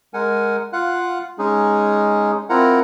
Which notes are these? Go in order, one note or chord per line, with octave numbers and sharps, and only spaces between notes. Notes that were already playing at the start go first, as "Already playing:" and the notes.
G#3 A#4 F#5 G#5
F4 F5 F#5 F#6
G#3 C#4 D#4 G#4
C4 E4 F4 A#4 F#5 A#5